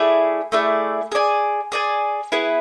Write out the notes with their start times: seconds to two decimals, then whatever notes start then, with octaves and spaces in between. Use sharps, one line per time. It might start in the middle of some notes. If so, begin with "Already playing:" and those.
Already playing: A3 E4 G#4 D5
0.52 A3 E4 G#4 D5
1.12 G#4 D5 G#5
1.72 G#4 D5 G#5
2.32 B3 E4 G#4 B4